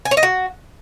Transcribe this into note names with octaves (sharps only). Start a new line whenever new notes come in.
G#5
C#5
D#5
F#4